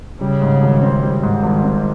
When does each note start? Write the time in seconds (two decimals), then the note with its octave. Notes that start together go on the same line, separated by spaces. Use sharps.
0.21 C#3 G3
0.42 G#2
0.62 G#1
0.82 C4
1.03 G3
1.23 G#2
1.43 G#1
1.63 C4